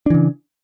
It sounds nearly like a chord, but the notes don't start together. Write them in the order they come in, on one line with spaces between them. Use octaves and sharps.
D4 E3 C#3